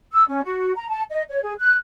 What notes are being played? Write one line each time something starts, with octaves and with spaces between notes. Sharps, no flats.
E6
C#4
F#4
A#5
A5
D#5
C#5
G#4
F#6